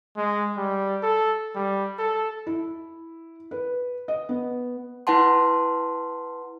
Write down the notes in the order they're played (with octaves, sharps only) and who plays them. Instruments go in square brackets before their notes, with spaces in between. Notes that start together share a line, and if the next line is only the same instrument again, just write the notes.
[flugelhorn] G#3
G3
A4
G3
A4
[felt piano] E4
B4
D#5
B3
[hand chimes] E4 B4 F#5 A5 C6